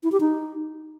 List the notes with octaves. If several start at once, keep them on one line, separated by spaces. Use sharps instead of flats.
E4
G4
D#4